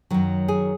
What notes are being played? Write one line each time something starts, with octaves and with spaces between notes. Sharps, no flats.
F#2 D#3 F#3
G#4